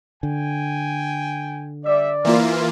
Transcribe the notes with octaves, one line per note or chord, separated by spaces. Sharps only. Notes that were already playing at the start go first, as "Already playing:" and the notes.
D3 G5 G#5
G3 D5 E5
E3 A#3 F4 A#4 C5 E5